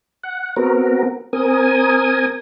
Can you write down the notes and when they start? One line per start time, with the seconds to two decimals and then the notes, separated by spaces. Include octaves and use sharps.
0.23 F#5
0.56 B3 C4 F#4 A#4
1.33 C4 A#4 G#5 D#6